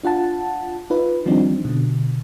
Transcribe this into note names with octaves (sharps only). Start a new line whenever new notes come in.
D4 F4 F#5 A5
D#4 F4 B4
D#3 F3 G3 C4 D4 D#4
B2 D3